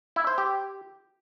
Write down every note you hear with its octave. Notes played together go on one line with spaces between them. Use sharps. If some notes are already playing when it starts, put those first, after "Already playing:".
E4
C5
G4